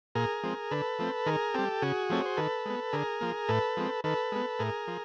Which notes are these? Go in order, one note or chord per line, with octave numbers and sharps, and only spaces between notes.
A#2 G#4 A#4
F3 G#3 C4
D3 A4 B4
F3 A3 C4
D#3 G#4 A#4
G3 C4 G4 A4
C#3 F#4 G#4
F3 A3 C4 C#5
C5
D#3 A4 B4
G#3 B3
D3 G#4 A#4
F3 A#3
A2 A4 B4
F3 G#3 C4
D#3 A4 B4
G#3 B3
A2 G#4 A#4
F3